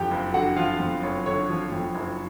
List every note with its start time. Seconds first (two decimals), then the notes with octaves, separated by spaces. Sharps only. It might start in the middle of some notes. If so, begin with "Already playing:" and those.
Already playing: F2 D3 F3 G4 G5
0.11 F#1
0.34 D3 F#4 F#5
0.56 F3 F4 F5
0.80 F2
1.02 F#1 C#5
1.26 D3 C#5
1.49 F3
1.72 F2
1.95 F#1